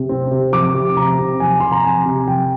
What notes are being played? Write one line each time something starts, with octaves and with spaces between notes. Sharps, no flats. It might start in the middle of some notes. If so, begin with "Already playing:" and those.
Already playing: C3
C4
C3
F3 D6
C3
C4 A#5
C3
F3 G#5
C3 C6
A#5
C4 G#5
C3
F3 G5